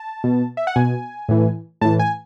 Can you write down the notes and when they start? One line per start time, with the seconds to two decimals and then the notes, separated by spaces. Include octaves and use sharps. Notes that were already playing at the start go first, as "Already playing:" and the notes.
Already playing: A5
0.24 B2
0.57 E5
0.67 F#5
0.76 B2 G#5
1.29 A2 E3
1.81 A2 E3 A5
1.99 G#5